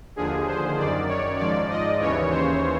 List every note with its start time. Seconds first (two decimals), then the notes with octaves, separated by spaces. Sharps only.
0.16 D#2 D3 F3 G#4
0.47 C5
0.77 F#2 D#3 D5
1.08 C#5
1.38 G#2 F3 D5
1.70 D#5
1.99 D#2 C#3 E3 C#5
2.30 C5